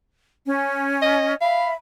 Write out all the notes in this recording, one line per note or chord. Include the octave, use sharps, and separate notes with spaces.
C#4
D#5
E5 F5 B5